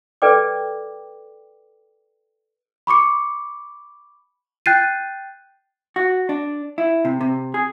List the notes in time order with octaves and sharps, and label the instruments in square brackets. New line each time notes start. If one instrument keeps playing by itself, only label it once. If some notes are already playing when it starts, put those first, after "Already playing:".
[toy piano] A4 B4 D5 G5 D6
[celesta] B5 C#6 D6 C#7
G5 F#6 G6 A6 C7 D#7
[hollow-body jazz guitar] F#4
D4
E4
C3
C3
G#4